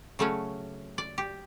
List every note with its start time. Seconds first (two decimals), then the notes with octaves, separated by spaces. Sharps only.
0.19 C#3 F#3 A3 C#4
0.98 D5
1.18 G4